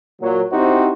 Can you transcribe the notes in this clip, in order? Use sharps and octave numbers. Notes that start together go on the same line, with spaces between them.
A#2 F#3
C4 D#4 E4 F#4 G4 C5